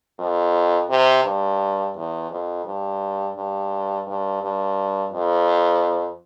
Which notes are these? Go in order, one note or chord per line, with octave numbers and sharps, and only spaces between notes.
F2
C3
G2
E2
F2
G2
G2
G2
G2
F2